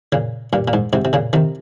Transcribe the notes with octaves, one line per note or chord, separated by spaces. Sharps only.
A#2 C#3
G2 A#2
A#2
G#2
G#2 C3
C3
A#2 C#3
C3 D#3